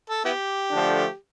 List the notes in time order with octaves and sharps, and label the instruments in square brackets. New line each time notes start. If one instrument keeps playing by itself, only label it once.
[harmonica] A4
B3 E4 G4
[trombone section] D3 F3 A3 D4